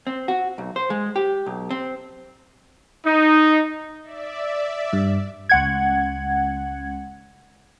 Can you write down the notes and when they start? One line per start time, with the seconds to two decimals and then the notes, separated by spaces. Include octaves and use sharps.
0.07 C4
0.28 F#4
0.58 B1
0.76 C5
0.90 G#3
1.16 G4
1.46 B1
1.71 C4
3.05 D#4
4.03 D5 E5
4.93 G2
5.49 C#2 F#5 G#6